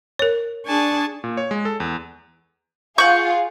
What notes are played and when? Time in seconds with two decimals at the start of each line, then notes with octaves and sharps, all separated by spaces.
0.19 A#4 C#5
0.66 D4 G#4 G#5 A5 C#6
1.24 A#2
1.37 C#5
1.51 G#3
1.65 A4
1.80 E2
2.98 F4 G#4 F5 F#5 C#6 G6